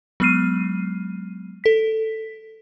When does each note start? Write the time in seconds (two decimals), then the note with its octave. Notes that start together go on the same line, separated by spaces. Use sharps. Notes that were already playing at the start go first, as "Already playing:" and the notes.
0.20 F#3 G#3 B3 F6 C7 D#7
1.64 A4 B6